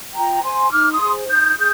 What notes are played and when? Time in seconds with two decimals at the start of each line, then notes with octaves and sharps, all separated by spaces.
0.15 F4 G5 A#5
0.44 C5 G#5 C6
0.71 D#4 D6 F6
0.90 C6 D#6
1.00 G#4 C5
1.28 D#4 D#6 G6
1.57 G#4 D#6 G6